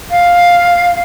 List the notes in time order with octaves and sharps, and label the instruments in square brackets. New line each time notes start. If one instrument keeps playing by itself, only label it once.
[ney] F5